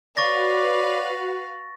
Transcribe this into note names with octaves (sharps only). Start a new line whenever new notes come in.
F#4 B4 C#5 D5 F5 C#6 A6 A#6